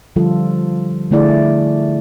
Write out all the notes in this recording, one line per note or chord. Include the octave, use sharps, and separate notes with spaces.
D3 F3 G3 F4 A4
D3 A3 E4 G#4 D5